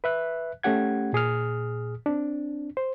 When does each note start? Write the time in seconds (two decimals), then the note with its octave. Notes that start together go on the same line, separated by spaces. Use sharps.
0.04 B4 E5 F#6
0.63 A3 C#4 G4 F#5 G#6
1.13 A#2 G#4 D#6 F6
2.06 C4 D4
2.77 C5